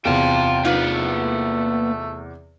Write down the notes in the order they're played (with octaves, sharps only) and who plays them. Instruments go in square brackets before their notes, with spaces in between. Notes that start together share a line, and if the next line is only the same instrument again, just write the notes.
[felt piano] E2 C3 [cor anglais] F4 [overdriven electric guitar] G5 A5
[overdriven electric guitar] A#3 B4 [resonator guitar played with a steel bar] D#4 F4
[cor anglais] A3